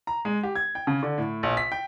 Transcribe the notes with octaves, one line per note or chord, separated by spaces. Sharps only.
A#5
G#3
G4
G#6
G5
C#3
D3
A2
A#1
B6
G5